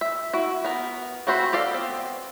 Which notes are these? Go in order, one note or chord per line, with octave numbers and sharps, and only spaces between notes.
E5
E4 F#4
B3 A#4
A3 C4 F#4 C5 B5
G4 A4 D5 F5
B3 C4